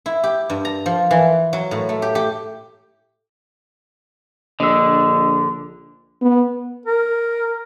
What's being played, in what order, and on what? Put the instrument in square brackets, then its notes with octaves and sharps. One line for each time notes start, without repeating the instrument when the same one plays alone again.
[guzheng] E4
G4
G2
A#5
F3
E3
F#3
A2
A3
G4
G4
[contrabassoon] A#1 [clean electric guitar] D3 [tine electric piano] D#5 E6
[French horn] B3
[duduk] A#4